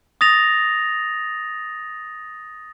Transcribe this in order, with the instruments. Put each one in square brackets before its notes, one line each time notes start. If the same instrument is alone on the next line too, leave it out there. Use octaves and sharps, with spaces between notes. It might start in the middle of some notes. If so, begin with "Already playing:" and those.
[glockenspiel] D#6 A6 A#6 F7